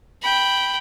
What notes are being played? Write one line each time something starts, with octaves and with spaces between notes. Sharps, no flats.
G5 B5